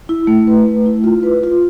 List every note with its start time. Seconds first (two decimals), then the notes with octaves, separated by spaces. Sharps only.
0.09 E4
0.27 A3
0.47 B4
0.66 A3
0.86 E4
1.04 F4
1.23 B4
1.43 F4